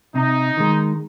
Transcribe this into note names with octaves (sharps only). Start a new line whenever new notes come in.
C3 D#4
D#3 G#3